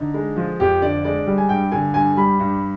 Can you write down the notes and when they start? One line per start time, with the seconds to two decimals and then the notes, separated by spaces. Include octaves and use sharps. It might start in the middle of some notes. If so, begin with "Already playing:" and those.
Already playing: D3 D#4
0.14 G#3
0.37 F3 F4
0.60 F2 G4
0.82 D3 D5
1.04 G#3 D5
1.27 G3
1.38 G#5
1.49 G2 G5
1.72 D3 G#5
1.94 G2 G#5
2.17 G3 B5
2.40 G2